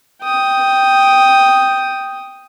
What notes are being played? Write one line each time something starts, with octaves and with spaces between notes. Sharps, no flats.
G5 D#6